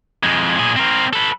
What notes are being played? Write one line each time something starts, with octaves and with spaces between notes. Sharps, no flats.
F2 G#3
A#2 G#4
C4 A#4
A4 B4